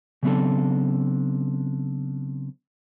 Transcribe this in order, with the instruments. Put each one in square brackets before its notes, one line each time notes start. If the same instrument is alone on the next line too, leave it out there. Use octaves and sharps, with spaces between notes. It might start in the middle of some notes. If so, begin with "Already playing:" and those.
[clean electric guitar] C#3 F#3 B3 C4 D4 A4